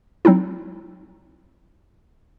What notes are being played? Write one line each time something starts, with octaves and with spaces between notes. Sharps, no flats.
F#3 C4 D#4 E4